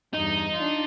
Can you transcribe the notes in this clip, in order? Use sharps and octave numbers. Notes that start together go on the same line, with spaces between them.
E2 G2 D#4
D4 F4